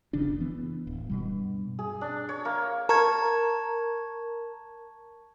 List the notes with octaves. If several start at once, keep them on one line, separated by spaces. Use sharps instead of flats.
F#1 C#3 E3 D4
E3 B3
D1
G2 B2 G3
G#4
D4
C#5
A#3
A#4 A5 C#6 G#6